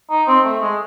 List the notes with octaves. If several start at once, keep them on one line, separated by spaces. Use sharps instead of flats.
D#4
C4
A3
G#3